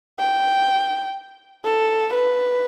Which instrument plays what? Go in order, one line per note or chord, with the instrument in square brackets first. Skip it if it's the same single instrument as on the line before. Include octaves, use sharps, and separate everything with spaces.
[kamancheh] G5
A4
B4